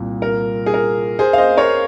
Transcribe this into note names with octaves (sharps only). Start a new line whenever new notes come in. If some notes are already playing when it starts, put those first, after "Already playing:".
Already playing: C2 A#2
A#4
G#4
A#4
G#4 C5
F5
C5 D#5
A#4 C#5